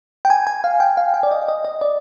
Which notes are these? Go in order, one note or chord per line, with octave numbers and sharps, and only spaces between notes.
G5
G#5
G#5
F5
G5
F5
G5
D5
D#5
D#5
D#5
D5